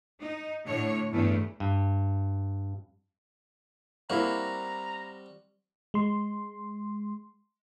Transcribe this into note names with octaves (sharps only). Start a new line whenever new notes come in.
D#4
A2 D3 C#5
E2 G2 A3
G2
G3 A#3 C4 E4 F#4 A#5
G#3 C6